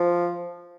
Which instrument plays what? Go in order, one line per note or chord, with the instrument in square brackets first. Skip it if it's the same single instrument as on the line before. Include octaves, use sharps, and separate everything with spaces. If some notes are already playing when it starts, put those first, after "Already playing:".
Already playing: [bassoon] F3